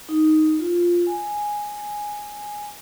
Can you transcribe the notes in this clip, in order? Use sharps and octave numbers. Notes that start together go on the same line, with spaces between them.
D#4
F4
G#5